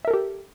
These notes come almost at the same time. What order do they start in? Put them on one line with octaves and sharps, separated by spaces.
E5 A#4 A4 G4